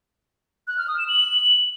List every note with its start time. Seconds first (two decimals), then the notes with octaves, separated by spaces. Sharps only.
0.68 F#6
0.78 F6
0.88 D#6
0.98 E7
1.08 F#7